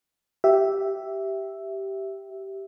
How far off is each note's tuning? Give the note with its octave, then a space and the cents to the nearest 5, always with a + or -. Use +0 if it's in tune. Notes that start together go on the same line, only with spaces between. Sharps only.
G4 -10 E5 +0